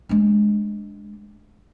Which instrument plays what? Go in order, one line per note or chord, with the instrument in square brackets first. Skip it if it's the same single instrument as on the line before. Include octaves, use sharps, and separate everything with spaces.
[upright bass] G#3 D4